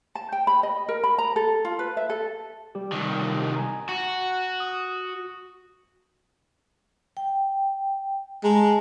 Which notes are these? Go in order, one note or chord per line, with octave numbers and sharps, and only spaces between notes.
A5
G5
B5
D#5
A#4
B5
A#5
A4
F4
B4
E5
A4
G3 G4
C2 D#3
G#5 A#5
F#4
D#6
G5
G#3 A5 A#5